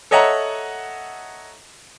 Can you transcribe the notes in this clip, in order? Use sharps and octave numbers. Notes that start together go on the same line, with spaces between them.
A4 C#5 D#5 E5 F#5 A#5